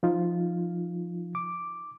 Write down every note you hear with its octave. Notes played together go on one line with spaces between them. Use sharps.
F3 D#4 F4
D6